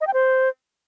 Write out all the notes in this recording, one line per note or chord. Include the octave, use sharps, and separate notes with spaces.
D#5
G5
C5